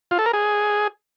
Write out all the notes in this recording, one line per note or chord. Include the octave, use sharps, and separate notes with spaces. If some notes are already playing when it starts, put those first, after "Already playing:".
F4
A4
A#4
G#4